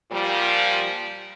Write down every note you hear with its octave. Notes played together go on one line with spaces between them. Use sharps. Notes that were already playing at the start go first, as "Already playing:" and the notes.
A#2 F3 G3